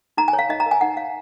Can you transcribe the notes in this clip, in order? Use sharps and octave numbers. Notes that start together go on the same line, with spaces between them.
D#4 A#5
G#5
C#5
F5
D#4 D#5
A#5
A#4
G#5
D#4 F#5
C#5 F5